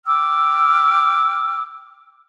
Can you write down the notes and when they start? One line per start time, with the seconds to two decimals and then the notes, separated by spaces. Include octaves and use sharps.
0.06 G5 D6 E6 F6